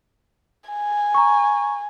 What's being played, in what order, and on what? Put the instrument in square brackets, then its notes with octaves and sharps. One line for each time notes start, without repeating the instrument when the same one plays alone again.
[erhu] G#5
[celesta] A#5 C#6